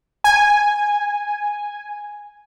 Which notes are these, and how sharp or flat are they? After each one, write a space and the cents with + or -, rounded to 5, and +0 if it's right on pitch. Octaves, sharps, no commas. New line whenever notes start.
G#5 -5